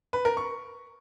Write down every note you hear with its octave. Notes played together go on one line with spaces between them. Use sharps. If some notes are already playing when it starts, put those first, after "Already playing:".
B4
A#4
C#6